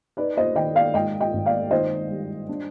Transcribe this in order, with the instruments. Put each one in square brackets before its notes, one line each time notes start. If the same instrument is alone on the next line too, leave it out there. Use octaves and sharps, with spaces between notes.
[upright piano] D#4 B4 D5
C5 D#5
D#3 D#5 G5
D5 F5
G#2 D#5 G5
D#5 G5
G#1
D5 F5
D#3 C5 D#5
G3
D4